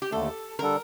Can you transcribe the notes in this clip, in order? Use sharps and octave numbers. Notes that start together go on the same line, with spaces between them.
G4
D#2 D3 A3 A4
D3 G3 D4 A4 A#4